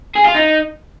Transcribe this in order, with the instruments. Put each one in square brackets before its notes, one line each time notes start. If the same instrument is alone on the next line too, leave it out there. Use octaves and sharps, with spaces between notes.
[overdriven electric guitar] G#4
F4
D#4